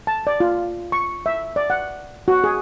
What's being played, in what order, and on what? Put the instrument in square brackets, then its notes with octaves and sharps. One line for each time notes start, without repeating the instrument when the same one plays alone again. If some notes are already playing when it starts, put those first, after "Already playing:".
[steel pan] A5
D5
F4
C#6
E5
D5
F#5
F#4
G#4